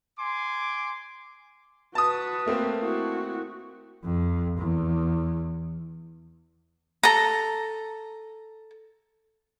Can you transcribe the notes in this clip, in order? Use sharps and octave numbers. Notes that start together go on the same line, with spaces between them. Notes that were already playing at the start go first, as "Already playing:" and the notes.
G#5 C6 D6
F#4 B4 A5 D#6
A3 A#3 C4
E4 F#4
F2
E2
A4 A#5